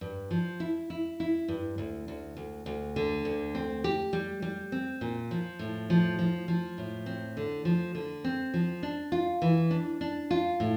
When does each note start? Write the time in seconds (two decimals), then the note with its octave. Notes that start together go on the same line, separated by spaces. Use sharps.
0.01 G2
0.31 F3
0.60 E4
0.90 E4
1.20 E4
1.48 G2
1.78 D2
2.08 D2
2.37 D2
2.66 D2
2.96 D3
3.25 D2
3.55 C4
3.84 G4
4.13 G3
4.42 G3
4.72 C4
5.01 A#2
5.31 F3
5.59 A2
5.90 F3
6.19 F3
6.48 F3
6.78 A2
7.06 C4
7.37 D3
7.65 F3
7.95 D3
8.24 C4
8.54 F3
8.83 D4
9.12 F4
9.42 E3
9.71 D4
10.01 D4
10.31 F4
10.60 A2